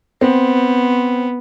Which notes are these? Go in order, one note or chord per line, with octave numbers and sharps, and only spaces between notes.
B3 C4